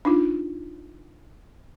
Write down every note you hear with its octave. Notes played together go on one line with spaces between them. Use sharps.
D4 D#4 F4